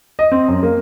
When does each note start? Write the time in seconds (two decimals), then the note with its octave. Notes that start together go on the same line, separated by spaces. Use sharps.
0.19 D#5
0.32 C4
0.48 F#2
0.63 A#3